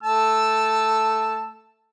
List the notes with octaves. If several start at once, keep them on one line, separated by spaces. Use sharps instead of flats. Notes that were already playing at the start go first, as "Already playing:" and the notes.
A3 A5 E6